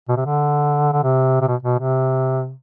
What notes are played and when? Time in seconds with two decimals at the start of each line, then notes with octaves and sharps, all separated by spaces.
0.09 B2
0.17 C3
0.25 D3
0.92 D3
1.03 C3
1.41 C3
1.48 B2
1.63 B2
1.80 C3